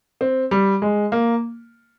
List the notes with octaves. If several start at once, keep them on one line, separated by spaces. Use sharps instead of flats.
C4
G3
G#3
A#3